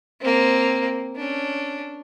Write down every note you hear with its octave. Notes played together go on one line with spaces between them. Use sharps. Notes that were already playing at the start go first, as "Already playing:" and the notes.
A#3 C4
C#4 D4